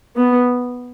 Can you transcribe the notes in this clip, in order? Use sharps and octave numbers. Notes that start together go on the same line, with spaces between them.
B3